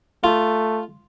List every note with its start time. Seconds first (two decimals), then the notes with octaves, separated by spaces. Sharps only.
0.24 A3 F4